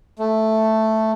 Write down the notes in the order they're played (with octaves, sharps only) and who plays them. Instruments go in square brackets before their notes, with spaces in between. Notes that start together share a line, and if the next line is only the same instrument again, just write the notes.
[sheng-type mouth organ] A3